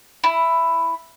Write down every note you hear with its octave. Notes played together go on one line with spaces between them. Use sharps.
E4